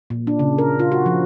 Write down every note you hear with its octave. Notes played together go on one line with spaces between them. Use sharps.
A#2
D4
C#3
A#4
F4
F#4
F3